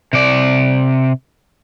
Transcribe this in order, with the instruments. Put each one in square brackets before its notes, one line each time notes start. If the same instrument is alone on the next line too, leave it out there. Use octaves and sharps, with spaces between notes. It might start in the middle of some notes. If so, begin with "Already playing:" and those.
[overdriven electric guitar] C3 D5